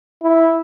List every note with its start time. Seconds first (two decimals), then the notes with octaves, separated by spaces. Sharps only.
0.23 E4